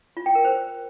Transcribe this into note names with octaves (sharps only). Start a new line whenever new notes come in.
F4
G5
A#4
C5